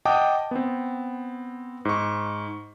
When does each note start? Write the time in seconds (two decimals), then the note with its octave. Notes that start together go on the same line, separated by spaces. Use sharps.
0.05 D#5 F#5 G5 A5 D6 D#6
0.51 B3 C4
1.85 G#2 C#6